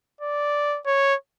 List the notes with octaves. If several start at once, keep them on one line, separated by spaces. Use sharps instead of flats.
D5
C#5